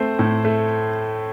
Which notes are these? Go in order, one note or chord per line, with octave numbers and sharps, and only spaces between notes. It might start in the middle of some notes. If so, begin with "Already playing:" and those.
Already playing: A3 C4 C5
A2
A3